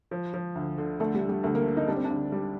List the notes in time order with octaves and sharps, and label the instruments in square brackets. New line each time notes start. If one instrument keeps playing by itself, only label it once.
[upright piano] F3
F3
D2
D3
[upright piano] D3 [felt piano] A3
[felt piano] G3
[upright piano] D3
[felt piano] G3
[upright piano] D2 [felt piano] A3
[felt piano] A#3
[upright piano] D3
[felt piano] D#4
[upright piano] G3 [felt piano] D4
[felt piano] C4
D4
[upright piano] D2
G3